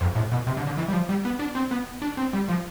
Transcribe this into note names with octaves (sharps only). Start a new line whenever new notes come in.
F2
A2
B2
C3
D3
D3
E3
G3
F3
G3
B3
D4
C4
B3
D4
C4
G3
F3